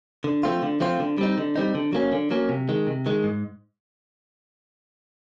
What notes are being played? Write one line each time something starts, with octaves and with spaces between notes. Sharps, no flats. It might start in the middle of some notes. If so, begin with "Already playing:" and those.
D3
F3 A3 C4 F4
D3
F3 A3 C4 F4
D3
G3 C4 D#4
D3
G3 C4 D#4
D3
F#3 A#3 C#4
D3
F#3 A#3 C#4
C3
D#3 G#3
C3
D#3 G#3
G#2